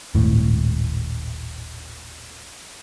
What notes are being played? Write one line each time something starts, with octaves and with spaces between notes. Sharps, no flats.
D#1 G#1 A2